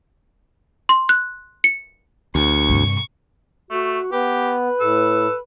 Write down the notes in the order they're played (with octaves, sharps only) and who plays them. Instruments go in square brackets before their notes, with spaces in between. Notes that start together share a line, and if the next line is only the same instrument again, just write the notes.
[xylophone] C6
F#6
C#7
[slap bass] D2 [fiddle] C#6
[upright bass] G2 C3
[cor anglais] A3 [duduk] F#4
[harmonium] B3 [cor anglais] G4 [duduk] B4
[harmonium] A2 [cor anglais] A4